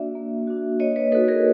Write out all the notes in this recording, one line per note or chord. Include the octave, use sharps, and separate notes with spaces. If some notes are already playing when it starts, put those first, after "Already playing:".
Already playing: A#3 D4 F#4 D5 E5
A#3
D4 F#4
A#3 C#5 D#5
B4 C#5
D#4 F#4 A4 B4
G#4 A#4